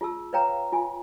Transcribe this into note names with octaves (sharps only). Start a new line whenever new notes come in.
F4 G#4 A5 E6
B4 C#5 F5 G5 A#5
F4 G#5